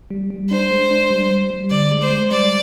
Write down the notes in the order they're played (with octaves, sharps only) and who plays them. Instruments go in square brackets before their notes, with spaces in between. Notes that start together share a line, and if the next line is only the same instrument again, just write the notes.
[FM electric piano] G3
G3
[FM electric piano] D4 [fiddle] C5
[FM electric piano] G#3
D4
G3
G3
G3
[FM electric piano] D3 [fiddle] D5
[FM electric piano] G#3
[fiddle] C5
[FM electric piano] G#3
[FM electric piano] G3 [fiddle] D5